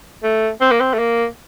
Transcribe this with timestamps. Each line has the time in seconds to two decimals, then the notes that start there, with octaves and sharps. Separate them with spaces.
0.23 A3
0.61 C4
0.71 A#3
0.80 C4
0.94 A3
0.99 A#3